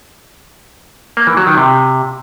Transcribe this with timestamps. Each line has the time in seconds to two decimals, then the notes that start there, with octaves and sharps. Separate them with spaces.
1.17 A#3
1.27 E3
1.37 F#3
1.47 D#3
1.57 C3